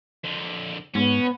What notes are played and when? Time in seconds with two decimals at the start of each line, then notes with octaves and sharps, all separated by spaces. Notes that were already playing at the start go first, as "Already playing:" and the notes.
0.24 F2 D3
0.95 G#2 B3 C#4